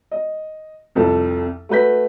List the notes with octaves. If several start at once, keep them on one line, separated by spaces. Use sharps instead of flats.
D#5
C2 F2 A4
A3 F#4 B4 G6 B6